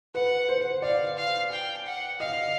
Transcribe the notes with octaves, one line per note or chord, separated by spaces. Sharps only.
B4 F#5
C5
D5 F5
F5
G5
F#5
D#5 F5